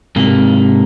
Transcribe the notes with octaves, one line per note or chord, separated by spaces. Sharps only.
G#2 C3 A#3